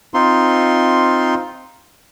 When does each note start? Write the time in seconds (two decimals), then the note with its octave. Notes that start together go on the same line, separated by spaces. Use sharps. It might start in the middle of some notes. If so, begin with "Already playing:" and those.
0.14 C4 D#4 F4 C6